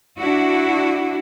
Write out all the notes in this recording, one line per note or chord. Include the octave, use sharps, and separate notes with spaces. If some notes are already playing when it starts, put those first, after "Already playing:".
D4 E4 F#4